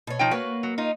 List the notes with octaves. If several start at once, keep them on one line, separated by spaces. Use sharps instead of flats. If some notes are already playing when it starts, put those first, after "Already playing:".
B2 C#4
F3 D#4 G5
A#3 F#4 B4 C#5
F#3
D#4 F4